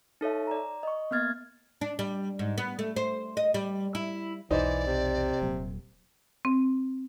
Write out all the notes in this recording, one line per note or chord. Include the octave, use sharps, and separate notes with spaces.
D#4 A4 C#5 E5
D5 A#5
D#5 C#6
A#3 B3 F6 G#6 A6
D4
G3
G#2
B3
A3
C5
D#5
G3
E4
B1 E2 E3 D#4 C5 D5
C3
D#1 F#3
C4